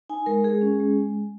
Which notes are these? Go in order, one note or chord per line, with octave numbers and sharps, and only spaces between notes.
D#4 G#5
G#3 A#4
G#3 G#4
C#4
G#3